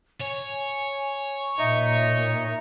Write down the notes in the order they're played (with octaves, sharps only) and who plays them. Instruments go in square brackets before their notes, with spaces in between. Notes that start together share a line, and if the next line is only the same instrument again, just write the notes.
[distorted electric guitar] C#5 [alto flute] G#5
[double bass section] A#2 [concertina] D#4 D#5 C#6 [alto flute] E5